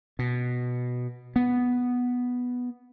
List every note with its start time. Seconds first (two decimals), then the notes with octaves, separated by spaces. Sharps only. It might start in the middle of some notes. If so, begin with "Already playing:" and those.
0.19 B2
1.36 B3